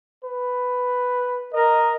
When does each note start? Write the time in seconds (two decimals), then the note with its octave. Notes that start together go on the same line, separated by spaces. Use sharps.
0.24 B4
1.53 A#4 D#5